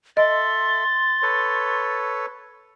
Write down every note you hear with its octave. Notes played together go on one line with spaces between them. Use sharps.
A4 D#5 E5 C6 A6
A4 B4 C#5